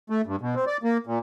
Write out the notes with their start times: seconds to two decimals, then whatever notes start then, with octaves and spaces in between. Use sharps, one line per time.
0.10 A3
0.26 G2
0.41 B2
0.55 C4
0.67 D5
0.83 A#3
1.06 A#2